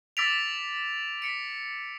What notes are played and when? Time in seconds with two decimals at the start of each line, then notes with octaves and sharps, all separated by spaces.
0.17 D6 E6 A6 B6 D7 F7
1.22 B6 C#7 D7